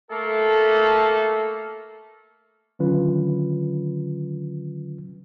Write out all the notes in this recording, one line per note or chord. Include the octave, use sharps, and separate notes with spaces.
A3 A#3 A4
D3 D#3 F#3 C#4 F4 B4